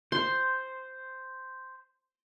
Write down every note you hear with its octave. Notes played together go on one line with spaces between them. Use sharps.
C5 C6